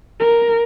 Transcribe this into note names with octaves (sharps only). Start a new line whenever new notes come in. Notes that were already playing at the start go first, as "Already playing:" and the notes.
A#4